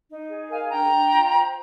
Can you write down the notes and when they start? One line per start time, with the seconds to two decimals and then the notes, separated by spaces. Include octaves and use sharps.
0.09 D#4
0.29 G#4
0.50 A#4 F5 G#5
0.70 D4 G5 A#5
0.91 D4
1.11 F4
1.32 C5